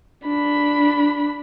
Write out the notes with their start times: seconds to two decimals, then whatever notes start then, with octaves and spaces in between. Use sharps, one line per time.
0.25 D4 B5